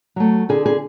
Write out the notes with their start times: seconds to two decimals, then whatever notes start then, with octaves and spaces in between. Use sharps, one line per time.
0.16 F#3 A3
0.49 D3 G#4
0.66 G#4